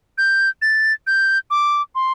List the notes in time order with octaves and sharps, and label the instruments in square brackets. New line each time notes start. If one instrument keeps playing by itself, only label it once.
[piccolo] G6
A6
G6
D6
C6